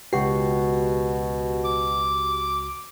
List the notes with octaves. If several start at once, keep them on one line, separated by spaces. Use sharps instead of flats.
C#2 B2 F#4 G4 C7
D6